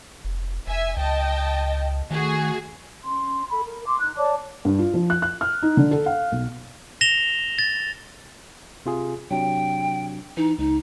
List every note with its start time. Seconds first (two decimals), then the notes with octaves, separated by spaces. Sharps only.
0.25 F1
0.67 F1 E5 G#5
0.97 C#2 D#5 G5 A5
2.11 D#3 A3 F#4 G#4
3.04 C#4 C6
3.50 A4 B5
3.62 A#4
3.85 C6 D6
4.00 D#4 F#6
4.16 C#5 D5 A5 D6
4.65 G2
4.79 F4
4.94 F3
5.10 F#6
5.22 F#6
5.41 F6
5.62 D#4
5.77 D3
5.91 A4
6.06 F5
6.32 B1
7.01 A#6 E7 F7 G7
7.59 A6
8.86 C3 F4 G#4
9.31 C3 F#3 D4 G5
10.37 E3 D#4
10.59 C#2 D#4